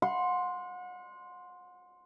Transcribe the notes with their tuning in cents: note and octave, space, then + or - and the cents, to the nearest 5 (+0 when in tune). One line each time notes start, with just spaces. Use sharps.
F#5 -35 C6 +0